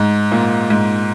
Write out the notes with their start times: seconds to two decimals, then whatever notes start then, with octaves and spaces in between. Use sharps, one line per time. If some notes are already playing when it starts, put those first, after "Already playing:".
Already playing: G#2
0.32 A#2
0.70 G#2